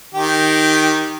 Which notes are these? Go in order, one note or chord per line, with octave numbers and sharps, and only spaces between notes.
D#3 G4